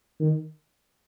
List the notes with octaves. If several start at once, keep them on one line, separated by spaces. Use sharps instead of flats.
D#3